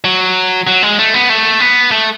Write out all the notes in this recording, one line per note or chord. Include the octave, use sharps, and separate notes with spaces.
F#3
F#3
G#3
A3
B3
A3
B3
A3